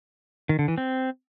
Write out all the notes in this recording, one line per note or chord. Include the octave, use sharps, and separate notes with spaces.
D#3
D3
E3
C4